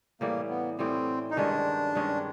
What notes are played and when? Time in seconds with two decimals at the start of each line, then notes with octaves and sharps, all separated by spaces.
0.21 A2 E3 G3 A#3
0.50 B3
0.78 A2 E3 G3 C4
1.31 D#4
1.37 G2 D#3 G#3 C#4 D4
1.95 G2 D#3 G#3 C#4